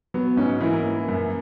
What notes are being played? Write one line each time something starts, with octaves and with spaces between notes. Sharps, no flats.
F#3 B3
G#2 C#4
E3 A#3 E4
A#3
F#2